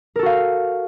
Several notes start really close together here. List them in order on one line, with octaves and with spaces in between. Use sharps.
A#4 A4 F#4 F5